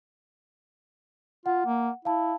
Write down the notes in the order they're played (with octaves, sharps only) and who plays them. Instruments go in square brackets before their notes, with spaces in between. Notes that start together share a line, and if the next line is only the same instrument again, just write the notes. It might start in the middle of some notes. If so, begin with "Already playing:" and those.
[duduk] F4 [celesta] F#5
[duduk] A#3
[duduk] E4 [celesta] F5 A5